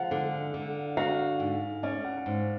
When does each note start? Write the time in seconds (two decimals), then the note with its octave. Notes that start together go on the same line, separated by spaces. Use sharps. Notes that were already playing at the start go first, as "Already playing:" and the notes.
Already playing: F3 G#3 F5 F#5
0.11 D3
0.54 D3
0.97 F#4 F5
1.40 G#2
1.83 C#4 D5
2.04 F#5
2.26 G#2